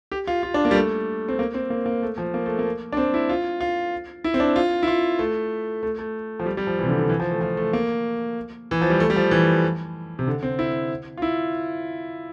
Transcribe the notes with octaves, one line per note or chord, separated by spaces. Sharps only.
G4
F4
F4
D4
A#3
G3
A3
C4
A#3
C4
A#3
A#3
A3
F3
A#3
A3
A#3
D4
C4
E4
F4
F4
E4
C4
D4
F4
E4
F4
A3
A3
A3
F3
G3
G3
F3
E3
C3
D3
D3
E3
F3
A3
F3
A3
A#3
E3
F3
G3
A3
G3
F3
E3
C3
D3
C4
E4
F4
E4